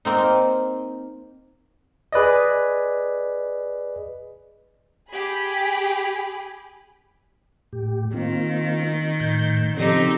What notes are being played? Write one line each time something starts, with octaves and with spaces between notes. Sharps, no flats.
A#3 C4 D#4
G#4 B4 D5 D#5
G4 G#4 B5
A2 G4
D#3 A#3 C4 F4
A2 G6
C#3 F3 C4 D#4 G4 A4